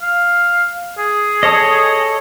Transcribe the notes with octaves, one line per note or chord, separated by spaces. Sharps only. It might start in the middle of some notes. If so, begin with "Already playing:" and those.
F5
G#4
A4 C#5 D#5